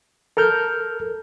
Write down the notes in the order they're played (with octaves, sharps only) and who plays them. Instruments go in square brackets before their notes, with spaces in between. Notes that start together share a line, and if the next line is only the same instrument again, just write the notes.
[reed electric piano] A4 A#4 F6 G6